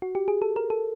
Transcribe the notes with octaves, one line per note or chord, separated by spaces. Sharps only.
F#4
G4
G#4
A4
A#4
A4